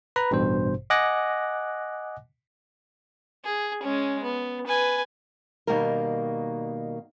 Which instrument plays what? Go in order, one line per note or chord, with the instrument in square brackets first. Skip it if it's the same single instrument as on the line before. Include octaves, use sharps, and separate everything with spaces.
[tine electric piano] B4 A#5 B5
A1 G2 B2 C5
D#5 F#5 G#5 D6 F#6 A#6
[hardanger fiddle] G#4
G#3 C#4
B3
B4 G#5
[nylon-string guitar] B2 D#3 G3 A#3 A#4